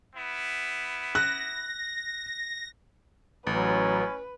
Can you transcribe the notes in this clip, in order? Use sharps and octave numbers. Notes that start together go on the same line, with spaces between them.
B3 E4
F#6 A#6
A1 F#3 C#4 B4